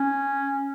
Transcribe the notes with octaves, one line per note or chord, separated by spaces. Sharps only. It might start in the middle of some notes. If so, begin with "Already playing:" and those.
Already playing: C#4